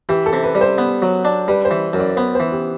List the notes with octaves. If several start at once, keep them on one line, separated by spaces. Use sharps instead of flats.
E3 G4
A4
C3
B4
G3
C5
B3
F#3
D4
G3 B4
C5
E3
F#2
D5
B3 C5
E3 C5
G4